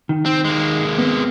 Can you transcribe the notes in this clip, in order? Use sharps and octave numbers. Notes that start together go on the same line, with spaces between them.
D#3
C4
G#3 A#3
B3 C4